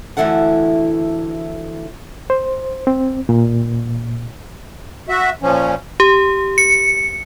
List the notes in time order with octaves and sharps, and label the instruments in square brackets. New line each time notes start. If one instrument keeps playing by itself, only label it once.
[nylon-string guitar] D2 G2 E3 E4 A4 F#5
[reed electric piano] C5
C4
A#2
[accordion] F#4 E5
A#2 F3 C#4
[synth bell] G4
C#7